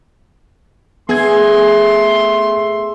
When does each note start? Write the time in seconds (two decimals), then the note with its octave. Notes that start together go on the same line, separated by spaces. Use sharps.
1.09 A3 B3 G#4 E5 C6 G#6